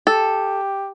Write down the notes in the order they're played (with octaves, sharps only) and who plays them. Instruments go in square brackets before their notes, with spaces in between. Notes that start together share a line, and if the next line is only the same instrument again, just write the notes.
[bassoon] G4 [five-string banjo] A4